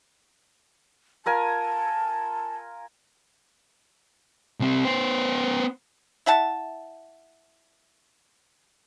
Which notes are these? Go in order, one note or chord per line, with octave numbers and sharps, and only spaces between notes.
F4 A#4 G#5 A5
C2 C4
B3 C5
E4 E5 F#5 A5